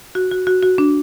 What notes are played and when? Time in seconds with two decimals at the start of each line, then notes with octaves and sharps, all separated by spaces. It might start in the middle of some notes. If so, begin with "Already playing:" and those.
0.15 F#4
0.31 F#4
0.47 F#4
0.63 F#4
0.78 D4